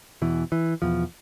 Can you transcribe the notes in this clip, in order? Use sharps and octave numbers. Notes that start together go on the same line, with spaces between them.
E2 B2 E3
E3
E2 B2 F3